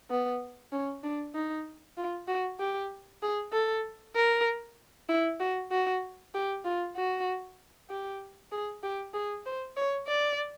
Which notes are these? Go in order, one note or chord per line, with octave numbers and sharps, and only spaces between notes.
B3
C#4
D4
D#4
F4
F#4
G4
G#4
A4
A#4
E4
F#4
F#4
G4
F4
F#4
G4
G#4
G4
G#4
C5
C#5
D5